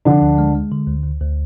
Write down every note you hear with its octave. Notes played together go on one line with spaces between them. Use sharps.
D3 F3 D4
D2
G#3
G#3
D3
D2
D2
D2